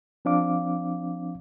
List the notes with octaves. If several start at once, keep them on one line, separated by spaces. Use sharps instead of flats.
F3 C4 D4 F5 D6